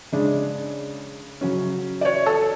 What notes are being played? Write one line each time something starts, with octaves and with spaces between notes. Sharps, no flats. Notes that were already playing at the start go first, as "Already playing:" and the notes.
C#3 G#3 D4
C#3 F#3 C#4
D5
C#5
A4